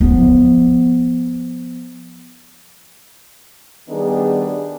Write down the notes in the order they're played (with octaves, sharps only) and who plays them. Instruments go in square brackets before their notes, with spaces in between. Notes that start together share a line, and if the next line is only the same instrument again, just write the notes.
[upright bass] F3 B3
[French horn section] D#3 G3 B3 D4 D#4 G#4